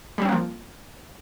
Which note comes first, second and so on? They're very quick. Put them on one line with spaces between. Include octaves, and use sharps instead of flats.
G3 C4 C#4 A#3 F3